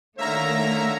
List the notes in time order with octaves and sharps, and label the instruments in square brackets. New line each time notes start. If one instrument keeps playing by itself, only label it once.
[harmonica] D3 A#3 C#5 [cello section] D#3 A3 [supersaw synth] E5 A#5